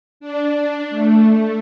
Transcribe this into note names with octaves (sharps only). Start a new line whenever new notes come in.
D4
A3